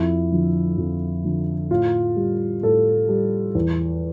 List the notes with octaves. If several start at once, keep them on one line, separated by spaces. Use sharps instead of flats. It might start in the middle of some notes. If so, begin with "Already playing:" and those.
Already playing: F2 E4
D3 F3
F2
D3 F3
A2 F4
G3
A2 A4
G3
E2